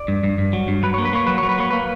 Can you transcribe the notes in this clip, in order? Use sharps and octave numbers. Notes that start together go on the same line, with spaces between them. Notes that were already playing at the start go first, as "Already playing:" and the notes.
Already playing: D5
G2
G2
G2
F#3
G2
F#3 B4
A#3 C#5
B4
A#3 C#5
F#3 B4
F#3 C#5
B4
A#3 C#5
A#3 B4